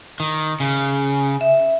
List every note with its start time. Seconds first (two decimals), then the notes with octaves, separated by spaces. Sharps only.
0.20 D#3
0.60 C#3
1.41 E5